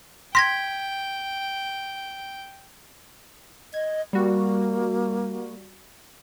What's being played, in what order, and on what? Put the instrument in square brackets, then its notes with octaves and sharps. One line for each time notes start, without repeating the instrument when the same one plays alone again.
[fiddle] G5 [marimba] C6 A#6 [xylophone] G#6 B6
[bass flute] D#5 [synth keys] G#6
[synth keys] G3 F#4 [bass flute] A#3